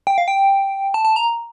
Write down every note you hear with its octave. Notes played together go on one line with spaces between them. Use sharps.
G5
F5
G5
A5
A5
A#5